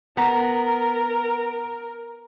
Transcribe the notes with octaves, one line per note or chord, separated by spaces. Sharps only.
B3 A#4 F#5 A#5